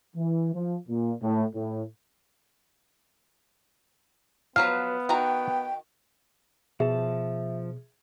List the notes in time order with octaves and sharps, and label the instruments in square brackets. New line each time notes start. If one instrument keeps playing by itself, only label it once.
[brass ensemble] E3
F3
A#2
A2
A2
[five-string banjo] F3 F#3 B4 [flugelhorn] B3 [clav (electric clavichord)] F5
[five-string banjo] D#3 F#4 A#5 [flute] G5
[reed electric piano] B2 [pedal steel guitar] F3 A5 [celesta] G#4 [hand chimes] E5